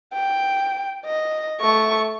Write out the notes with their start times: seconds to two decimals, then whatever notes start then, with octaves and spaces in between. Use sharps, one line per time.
0.13 G5
1.06 D#5
1.61 A3 C#6